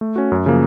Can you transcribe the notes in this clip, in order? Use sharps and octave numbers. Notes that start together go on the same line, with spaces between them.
A3
C#4 F#4
F#2
C#3 F3 A#3